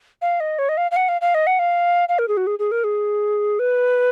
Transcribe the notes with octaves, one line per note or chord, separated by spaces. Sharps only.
F5
D#5
C#5
D#5
F5
F5
F#5
F5
F5
D#5
F#5
F5
F5
A#4
G#4
F#4
G#4
G#4
A#4
G#4
B4